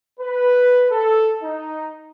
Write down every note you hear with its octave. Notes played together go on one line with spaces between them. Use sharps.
B4
A4
D#4